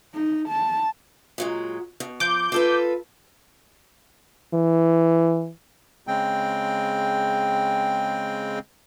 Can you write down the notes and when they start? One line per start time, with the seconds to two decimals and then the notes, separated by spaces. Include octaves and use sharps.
0.15 D#4
0.49 A5
1.38 A#2 F#3 G#3
2.00 B2
2.20 F3 D6 G6
2.52 F4 A4 B4
4.54 E3
6.07 C#3 G#3 C4 G5